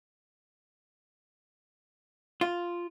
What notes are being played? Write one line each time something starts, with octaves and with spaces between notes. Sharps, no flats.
F4